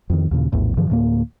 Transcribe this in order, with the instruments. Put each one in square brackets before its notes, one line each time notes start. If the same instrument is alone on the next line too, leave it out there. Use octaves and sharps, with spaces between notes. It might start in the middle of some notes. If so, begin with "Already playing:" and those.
[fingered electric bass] F2 D#3
D#2 A#2 C#3
A#1 E2 A2
G2 D3 E3 F3
D2 A2 A3 A#3